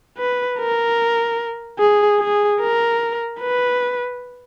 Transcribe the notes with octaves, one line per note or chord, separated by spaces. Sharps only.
B4
A#4
G#4
G#4
A#4
B4